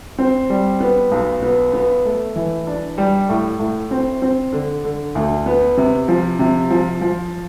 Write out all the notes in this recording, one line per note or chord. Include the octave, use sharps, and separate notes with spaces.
C4
G3
B3
B1
B3
B3
A3
E3
D4
G3
A2
A2
C4
C4
D3
D3
D2
B3
C3
F3
C3
F3
F3